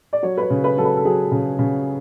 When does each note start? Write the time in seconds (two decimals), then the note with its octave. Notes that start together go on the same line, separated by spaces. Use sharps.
0.13 D5
0.23 F#3 C#5
0.37 B4
0.43 C#5
0.50 C#3
0.64 B4
0.77 F#3 A4
0.84 B4
0.97 A4
1.05 F#3 G#4
1.32 C#3
1.59 C#3